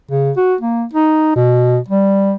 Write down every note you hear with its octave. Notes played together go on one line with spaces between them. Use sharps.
C#3
F#4
A#3
D#4
B2
G3